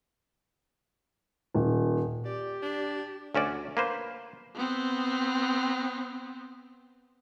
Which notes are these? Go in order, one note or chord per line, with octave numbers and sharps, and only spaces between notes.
D#1
G4 D5
D4
D2 C#4 F#4 D5
A#3 B4 C5
B3 C4